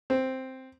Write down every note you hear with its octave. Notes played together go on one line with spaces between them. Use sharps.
C4